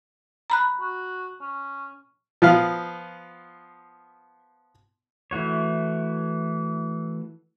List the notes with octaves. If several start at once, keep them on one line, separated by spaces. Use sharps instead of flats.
A#5 B5 F#6
F#4
C#4
F3 B3 F5
E3 A3 F#4 C#5